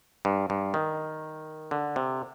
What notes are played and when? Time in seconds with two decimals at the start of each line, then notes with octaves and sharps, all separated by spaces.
0.25 G2
0.50 G2
0.74 D#3
1.71 D3
1.96 C3